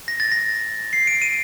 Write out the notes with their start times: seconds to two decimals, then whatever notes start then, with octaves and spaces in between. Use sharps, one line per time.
0.08 A#6
0.20 A6
0.32 A#6
0.93 C7
1.07 D7
1.22 D#7